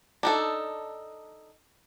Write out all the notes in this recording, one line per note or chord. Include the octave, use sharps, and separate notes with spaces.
D4 D#4 A4